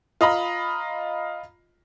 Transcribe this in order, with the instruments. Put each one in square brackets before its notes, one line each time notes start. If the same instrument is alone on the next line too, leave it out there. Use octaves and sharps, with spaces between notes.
[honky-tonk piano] F4 D#5 A#5 B5